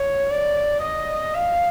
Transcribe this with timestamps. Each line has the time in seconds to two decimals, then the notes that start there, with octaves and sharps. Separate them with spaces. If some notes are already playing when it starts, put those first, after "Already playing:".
Already playing: C#5
0.31 D5
0.82 D#5
1.34 F5